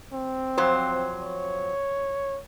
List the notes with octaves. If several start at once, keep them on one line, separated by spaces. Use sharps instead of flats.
C4
F2 F#3 C5
C#5